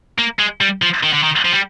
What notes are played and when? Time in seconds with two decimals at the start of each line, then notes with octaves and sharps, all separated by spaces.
0.19 A#3
0.39 G#3
0.61 G3
0.82 F3
1.03 D#3
1.14 D3
1.24 D#3
1.45 F3
1.52 G3